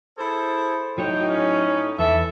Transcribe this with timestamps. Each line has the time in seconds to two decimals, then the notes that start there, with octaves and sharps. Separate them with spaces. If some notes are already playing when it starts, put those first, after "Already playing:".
0.18 E4 G#4 A4 C5
0.98 A2 F#3 D#4 F#4 C#5 G5
1.28 C#4
1.99 E2 E3 A4 E5